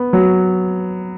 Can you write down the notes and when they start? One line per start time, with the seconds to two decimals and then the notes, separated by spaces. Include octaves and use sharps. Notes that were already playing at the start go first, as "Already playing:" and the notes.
Already playing: B3
0.13 F#3